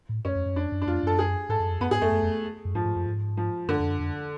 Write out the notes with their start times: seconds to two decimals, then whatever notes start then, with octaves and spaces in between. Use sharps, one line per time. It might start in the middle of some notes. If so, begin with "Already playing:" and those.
0.09 A2
0.25 F#2 C#4
0.35 F2
0.46 F#2
0.56 F2 D4
0.72 F#2
0.82 D4
0.87 F2 F4
1.03 F#2 A4
1.19 G#4
1.49 G#2 A4
1.60 F#2
1.70 F2
1.80 F#2 B3
1.91 G#2 G#4
2.02 F#2 A3
2.12 F#2
2.22 F2
2.65 F#2
2.75 G#2 F3
2.85 G#2
2.96 F#2
3.06 G#2
3.37 F3
3.68 F#2 D3
3.79 F2
3.89 F#2
4.00 F2